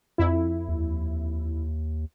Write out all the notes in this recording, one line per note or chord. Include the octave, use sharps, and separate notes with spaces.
F2 E4
D#2